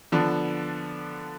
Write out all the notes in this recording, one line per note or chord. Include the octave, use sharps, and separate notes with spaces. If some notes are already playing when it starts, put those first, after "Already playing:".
D3 F3 B3 D4